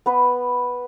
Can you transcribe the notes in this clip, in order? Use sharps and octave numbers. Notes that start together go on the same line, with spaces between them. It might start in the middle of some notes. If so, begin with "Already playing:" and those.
B3 B4